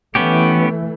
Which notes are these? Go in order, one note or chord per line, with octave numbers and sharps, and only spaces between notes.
E3 A3 B3 C#4 G4